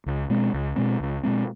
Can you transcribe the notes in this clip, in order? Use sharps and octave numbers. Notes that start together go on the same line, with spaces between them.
C#2
B2 G#3 C4
C#2
B2 G#3 C4
C#2
B2 G#3 C4